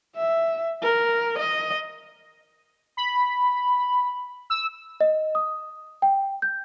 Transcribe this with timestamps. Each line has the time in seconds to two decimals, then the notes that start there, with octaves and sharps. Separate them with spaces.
0.16 E5
0.83 A#4
1.39 D#5
2.97 B5
4.50 E6
5.01 D#5
5.35 D#6
6.02 G5
6.42 G6